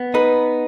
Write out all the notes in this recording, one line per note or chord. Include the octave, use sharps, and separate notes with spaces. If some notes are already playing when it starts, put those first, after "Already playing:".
Already playing: B3
D#4 B4